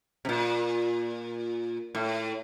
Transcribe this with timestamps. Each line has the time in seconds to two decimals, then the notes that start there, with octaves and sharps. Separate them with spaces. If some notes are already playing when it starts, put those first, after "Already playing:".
0.25 C3
0.29 A#2
1.95 A2